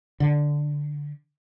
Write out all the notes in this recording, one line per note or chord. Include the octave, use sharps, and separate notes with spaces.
D3